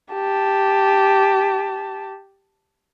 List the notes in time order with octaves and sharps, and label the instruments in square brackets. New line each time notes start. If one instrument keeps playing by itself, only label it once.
[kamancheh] G4 A5